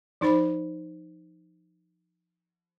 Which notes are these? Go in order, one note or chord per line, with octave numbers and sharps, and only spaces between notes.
F3 D#4 C5 B5